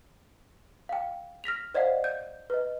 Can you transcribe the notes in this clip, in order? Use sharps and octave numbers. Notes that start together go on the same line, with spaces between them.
F5 G5
F6 A#6 B6 F7
C5 D5 D#5 F5 F#5
G6
B4 D#5